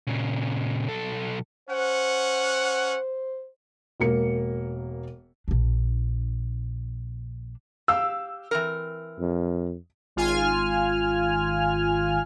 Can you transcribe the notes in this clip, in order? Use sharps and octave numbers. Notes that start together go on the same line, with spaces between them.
A#2 C#3
B1 A4
C#4 C5 F#5
E1 A#3 C#7
A#1 D4
G4 F5 E6
E3 C4 A#4
F2
G#1 F4 G#5 F6